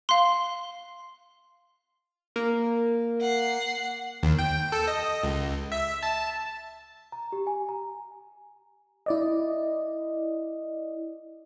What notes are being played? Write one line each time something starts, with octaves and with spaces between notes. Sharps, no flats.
F5 C6
A#3
F#5 C7
D#2
G5
A4
D#5
C#2
E5
A5
A#5
G4
G#5
A#5
E4 D5 D#5